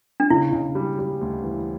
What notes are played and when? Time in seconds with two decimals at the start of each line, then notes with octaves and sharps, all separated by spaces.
0.20 D4
0.30 C#3 E4
0.52 C#3
0.75 G3
0.99 G3
1.21 D2
1.44 E3